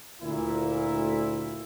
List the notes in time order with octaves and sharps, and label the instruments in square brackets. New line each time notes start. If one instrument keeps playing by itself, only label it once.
[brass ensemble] D2 A#2 E4